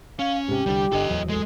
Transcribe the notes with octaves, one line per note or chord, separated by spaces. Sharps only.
C#4 F5
G#2 C3 G4
C2 D3 G3
G1 D3 A4 D#5
D1 E2 F#3
G#3 A4